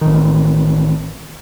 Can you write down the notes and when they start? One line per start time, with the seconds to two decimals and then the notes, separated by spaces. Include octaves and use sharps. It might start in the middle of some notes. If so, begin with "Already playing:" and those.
0.01 A1 D#3